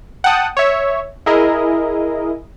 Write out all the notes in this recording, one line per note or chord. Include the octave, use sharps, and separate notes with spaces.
F#5 G5 A5 D#6
C#5 E5
E4 G#4 A#4 D#5